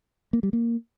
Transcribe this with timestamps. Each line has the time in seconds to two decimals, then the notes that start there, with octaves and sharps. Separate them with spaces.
0.33 A#3
0.43 G3
0.53 A#3